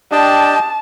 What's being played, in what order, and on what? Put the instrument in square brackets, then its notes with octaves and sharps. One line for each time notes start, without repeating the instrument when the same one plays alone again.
[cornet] D4 [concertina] G4 D#5 G5 [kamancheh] A5